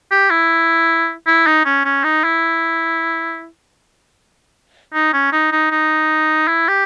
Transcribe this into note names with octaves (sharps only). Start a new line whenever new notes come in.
G4
E4
E4
D#4
C#4
C#4
D#4
E4
D#4
C#4
D#4
D#4
D#4
E4
G4